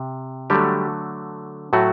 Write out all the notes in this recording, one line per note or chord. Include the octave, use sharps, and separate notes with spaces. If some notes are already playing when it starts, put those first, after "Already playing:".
Already playing: C3
D3 F#3 G3 A3 G4
A2 F#3 A3 F#4